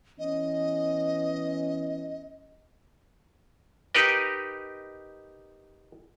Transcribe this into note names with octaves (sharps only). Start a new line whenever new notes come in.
E3 B3 C#4 D#5
D#4 G4 A#4 B4 D#5